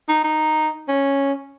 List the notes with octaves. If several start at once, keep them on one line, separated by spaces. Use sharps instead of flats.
D#4
D#4
C#4